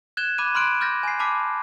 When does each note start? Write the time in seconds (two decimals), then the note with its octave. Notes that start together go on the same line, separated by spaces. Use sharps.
0.17 F#6 G#6 E7 G7
0.38 B5 D6 F#6 D#7
0.55 B5 C6 F6 F#6 D7 F#7
0.81 D6 F6 G6 A6 A#6
1.03 G#5 C7
1.19 A5 B5 D6 F6 B6